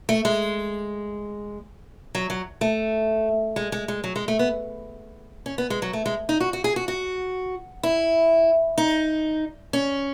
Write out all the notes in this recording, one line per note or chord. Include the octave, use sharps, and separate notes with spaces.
A3
G#3
F#3
F#3
A3
G#3
G#3
G#3
F#3
G#3
A3
B3
C#4
B3
G#3
F#3
A3
G#3
D#4
F#4
F#4
G#4
F#4
F#4
E4
D#4
C#4